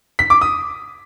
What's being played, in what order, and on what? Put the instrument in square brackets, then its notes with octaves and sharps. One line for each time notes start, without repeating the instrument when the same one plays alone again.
[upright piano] B6
D6
D#6